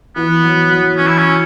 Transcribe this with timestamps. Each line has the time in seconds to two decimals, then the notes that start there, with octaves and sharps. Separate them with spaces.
0.16 E3 B3
0.43 F#3
0.70 F#3
0.97 E3 C#4
1.07 E4
1.18 C#4